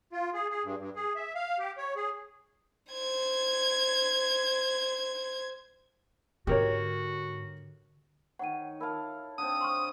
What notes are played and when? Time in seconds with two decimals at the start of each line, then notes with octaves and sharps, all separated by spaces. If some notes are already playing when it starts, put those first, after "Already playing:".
0.12 F4
0.34 G#4
0.51 G#4
0.64 G2
0.79 G2
0.96 G#4
1.16 E5
1.35 F5
1.59 G4
1.78 C#5
1.96 G#4
2.93 C5 G#6
6.47 G#2 D3 F#4 G4 A#4 C#5
8.39 D#3 C#5 F#5 D#7
8.80 E4 A4 A#4 F5 A5
9.38 D3 C4 D#6
9.61 C6 C#6 F6